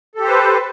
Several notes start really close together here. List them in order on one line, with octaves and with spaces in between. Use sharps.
A4 G4 C5 B4